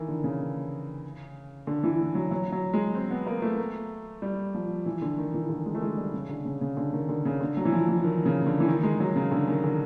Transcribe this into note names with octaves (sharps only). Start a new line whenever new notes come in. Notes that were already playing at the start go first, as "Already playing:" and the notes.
Already playing: D#3 E3
D3
C#3
D3
E3
F#3
F#3
F#3
G#3
C4
B3
A#3
A3
G3
F3
E3
D3
D#3
E3
D3
G#3
A3
G#3
G3
C#3
D3
C#3
C#3
D3
D#3
D3
C#3
D3
F#3
E3
F3
E3
D#3
C#3
D3
E3
D#3
G#3
F#3
C#3
D3
D#3
D3